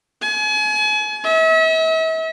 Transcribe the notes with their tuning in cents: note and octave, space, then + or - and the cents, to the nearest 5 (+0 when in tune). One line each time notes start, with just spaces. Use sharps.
G#5 +35
E5 -40